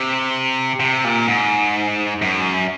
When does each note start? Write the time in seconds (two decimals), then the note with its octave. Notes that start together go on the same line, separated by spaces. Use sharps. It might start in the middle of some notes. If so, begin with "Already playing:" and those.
Already playing: C3
0.80 C3
1.04 A#2
1.28 G#2
2.22 F#2